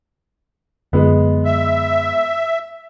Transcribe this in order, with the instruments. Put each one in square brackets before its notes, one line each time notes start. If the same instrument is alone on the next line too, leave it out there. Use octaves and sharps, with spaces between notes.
[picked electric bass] F#2 D3 [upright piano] G#3 B3
[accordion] E5